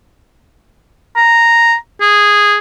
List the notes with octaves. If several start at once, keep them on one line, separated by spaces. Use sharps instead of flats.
A#5
G#4